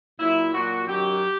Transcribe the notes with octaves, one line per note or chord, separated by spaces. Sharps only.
A#2 F#3 E4
A#2 F#3 F#4
F#2 D#3 F#3 G4